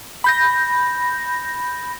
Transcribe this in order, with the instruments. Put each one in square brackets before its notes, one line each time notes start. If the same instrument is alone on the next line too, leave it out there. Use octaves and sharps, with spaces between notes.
[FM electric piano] B5 G6 A#6